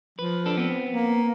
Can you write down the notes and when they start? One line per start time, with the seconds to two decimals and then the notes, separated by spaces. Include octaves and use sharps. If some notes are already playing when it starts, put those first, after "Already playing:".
0.19 F3 B4
0.46 D4 A4
0.58 B3 C4
0.90 A#3